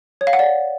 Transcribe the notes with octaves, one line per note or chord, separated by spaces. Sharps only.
C#5
F5
F#5
D5